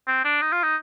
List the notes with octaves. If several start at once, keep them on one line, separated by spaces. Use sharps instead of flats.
C4
D4
D#4
F4
D#4